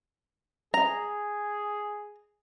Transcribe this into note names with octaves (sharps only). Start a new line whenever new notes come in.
G#4 A#5